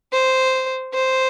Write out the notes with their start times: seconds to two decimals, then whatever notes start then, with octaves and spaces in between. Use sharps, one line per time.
0.13 C5
0.94 C5